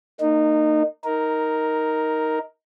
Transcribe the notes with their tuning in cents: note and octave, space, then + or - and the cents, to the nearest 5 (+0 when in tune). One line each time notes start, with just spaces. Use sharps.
A#3 -35 D#4 -20
D#4 +15 A#4 +0